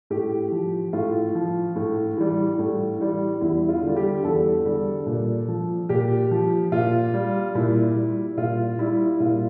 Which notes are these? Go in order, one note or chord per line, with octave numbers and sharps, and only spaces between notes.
A2 G4
F3
A2 F4
F3
A2
E3 G3
A2
E3 G3
E2 E4
F4
D3 G3
G4
E2 A4
D3 G3
A#2
F3
A#2 G4
F3
A#2 F4
G3
A#2 E4
G3
A#2 F4
G3 E4
A#2 F4